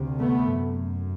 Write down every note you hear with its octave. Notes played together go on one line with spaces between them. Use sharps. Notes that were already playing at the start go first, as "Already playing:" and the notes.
Already playing: D2 C3
A3 B3
F#2